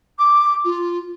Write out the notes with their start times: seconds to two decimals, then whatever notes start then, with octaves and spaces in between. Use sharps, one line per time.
0.18 D6
0.64 F4